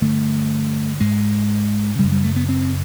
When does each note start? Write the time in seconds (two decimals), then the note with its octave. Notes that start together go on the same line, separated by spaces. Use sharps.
0.01 G2 D3 A3
1.00 G#2 G#3
1.99 C#3 G3
2.04 F#2
2.12 G3
2.24 A3
2.36 B3
2.49 C4